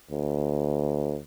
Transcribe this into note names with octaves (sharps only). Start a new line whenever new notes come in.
D2